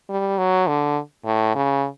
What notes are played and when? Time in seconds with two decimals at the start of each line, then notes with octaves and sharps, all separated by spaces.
0.10 G3
0.38 F#3
0.68 D3
1.26 A2
1.56 C#3